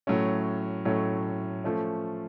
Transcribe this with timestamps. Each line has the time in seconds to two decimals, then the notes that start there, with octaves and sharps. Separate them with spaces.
0.07 A2 F#3 A3 C#4
0.85 A2 F#3 A3 C#4
1.64 F3 A3 C#4